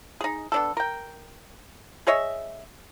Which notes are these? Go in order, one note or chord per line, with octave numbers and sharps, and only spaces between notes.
D#4 G#4
B3 D4 A4
A#4 G5
G#4 C#5 D#5 E5